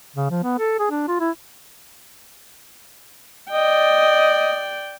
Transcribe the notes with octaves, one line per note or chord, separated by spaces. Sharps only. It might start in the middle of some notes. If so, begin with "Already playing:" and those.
C#3
F3
B3
A4
G#4
D4
F4
E4
D5 D#5 G5